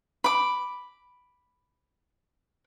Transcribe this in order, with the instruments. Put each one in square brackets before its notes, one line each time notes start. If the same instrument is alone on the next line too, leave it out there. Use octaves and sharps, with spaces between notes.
[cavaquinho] B5 D6